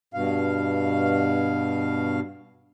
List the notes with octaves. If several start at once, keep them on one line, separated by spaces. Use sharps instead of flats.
G2 B2 F5